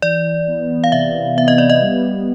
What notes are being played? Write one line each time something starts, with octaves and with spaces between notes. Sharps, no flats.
E3 D5
B3
F5
C3 E5
B3 E5
D#5
D5
D#5
G3